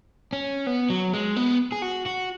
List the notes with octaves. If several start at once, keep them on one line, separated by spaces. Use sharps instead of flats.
C#4
B3
F#3
G#3
B3
G#4
F#4
F#4